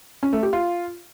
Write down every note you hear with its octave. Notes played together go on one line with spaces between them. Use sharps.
C#4
A3
G4
F4